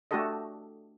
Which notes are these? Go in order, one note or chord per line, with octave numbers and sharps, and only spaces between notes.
A3 D4 F#4 G4 A4 D#5